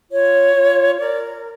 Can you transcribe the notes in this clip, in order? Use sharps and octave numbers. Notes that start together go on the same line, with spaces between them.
F4 C#5
F4
A#4 D5